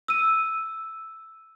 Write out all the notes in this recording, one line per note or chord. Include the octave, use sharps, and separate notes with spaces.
E6 D#7